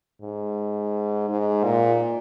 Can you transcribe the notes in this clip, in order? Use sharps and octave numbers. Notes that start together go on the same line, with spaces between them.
G#2
G#2
A#2